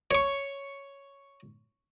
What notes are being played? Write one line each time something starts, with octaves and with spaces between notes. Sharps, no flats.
C#5 C#6